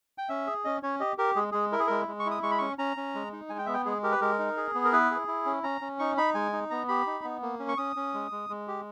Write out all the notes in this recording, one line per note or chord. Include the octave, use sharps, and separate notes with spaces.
G5
C#4 E5
G#4
C#4 D#5
C#4 C#5
G4 D#5
G4 A#4
G#3 G#4
G#3 G#4
E4 A#4
G#4
G#3 A#4
G#3
C#6
E4
D#6
G#3 C#6
B5
C#4 C#6
C#4 A#5
C#4
G#3
D#4
G#3 G#5
G5
B3 E5
G5
G#3 G#4
G4 A#4
B4
G#3 A#4
D#4
G#4
B3
A#4
E4 B4
G#4
E4
C#4
C#4 A#5
C#4
D#4 C#6
D#4 B5
G#3 G#5
D#4
B3 A#5
G4 B5
D#4
B3
A#3
C#4
C#6
C#4 D#6
C#4
G#3
G#3
G#3
G4